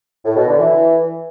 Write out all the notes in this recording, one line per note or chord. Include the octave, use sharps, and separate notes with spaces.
A2
B2
D3
E3